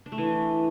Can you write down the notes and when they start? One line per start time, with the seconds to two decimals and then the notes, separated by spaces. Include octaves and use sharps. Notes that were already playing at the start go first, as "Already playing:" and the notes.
0.06 D4
0.12 A3
0.18 E3